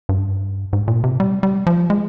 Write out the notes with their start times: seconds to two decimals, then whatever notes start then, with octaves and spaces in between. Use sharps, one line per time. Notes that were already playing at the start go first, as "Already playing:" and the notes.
0.09 G2
0.73 G#2
0.88 A#2
1.04 C3
1.20 G3
1.43 G3
1.67 F3
1.90 G#3